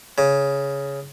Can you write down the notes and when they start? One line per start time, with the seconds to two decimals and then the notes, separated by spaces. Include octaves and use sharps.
0.18 C#3